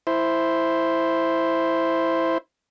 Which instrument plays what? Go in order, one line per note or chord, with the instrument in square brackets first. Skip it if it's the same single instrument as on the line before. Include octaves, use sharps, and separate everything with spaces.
[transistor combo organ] E4 C5